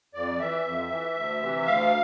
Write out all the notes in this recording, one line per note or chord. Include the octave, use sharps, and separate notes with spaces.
F2 D5
E3 E5
F2
E3
D2
C3 E3
D2 F5